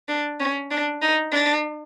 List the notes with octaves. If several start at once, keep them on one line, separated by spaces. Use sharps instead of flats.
D4
C#4
D4
D#4
D4